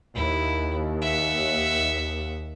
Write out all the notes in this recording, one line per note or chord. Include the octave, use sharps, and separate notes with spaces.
D#2 E4
E5 F#5